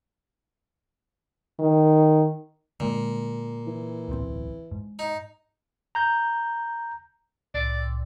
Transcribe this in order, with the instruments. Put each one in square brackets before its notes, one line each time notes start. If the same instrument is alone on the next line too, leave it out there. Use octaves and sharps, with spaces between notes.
[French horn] D#3
[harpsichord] A#2 [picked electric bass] D3 G#3 A#3
[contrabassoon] E3
[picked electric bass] D1 B1 C4
G#2
[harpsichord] D#4
[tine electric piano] A#5 G6
[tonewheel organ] C2 A2 [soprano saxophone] D5